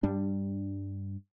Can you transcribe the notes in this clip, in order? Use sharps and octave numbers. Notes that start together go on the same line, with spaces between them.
G2 G3 D4